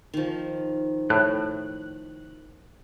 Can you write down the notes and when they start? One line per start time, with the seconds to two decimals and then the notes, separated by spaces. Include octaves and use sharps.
0.14 D#3 F3
1.10 A2 F#6